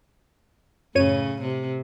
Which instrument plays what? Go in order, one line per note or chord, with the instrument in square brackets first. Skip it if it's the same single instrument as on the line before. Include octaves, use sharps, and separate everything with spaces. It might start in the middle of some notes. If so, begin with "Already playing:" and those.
[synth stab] F#2 C#5 D#7 [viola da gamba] A2 C#3
[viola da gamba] C3